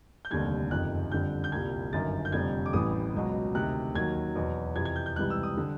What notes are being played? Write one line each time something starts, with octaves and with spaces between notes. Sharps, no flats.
G6
F1 D#2 D3 G3 G#6
F#1 F2 C3 D#3 F#6
F2 D3 G3 G6
G6
C2 A#2 G3 G#6
G1 F#2 D#3 A6
G6
F1 F2 D3 G3 G#6
D6
A1 A2 E3 G3 D#6
C#2 B2 F#3
D2 C3 D#3 F#6
D#2 D#3 F#3 G#6
E2 B2 F#3
F2 C3 E3 G#6
G#6
G6
G6
C#2 C3 E3 G3 F#6
E6
D#6
D3 G3